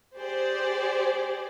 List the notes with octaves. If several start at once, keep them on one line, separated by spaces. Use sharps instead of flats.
G4 G#4 C5 D5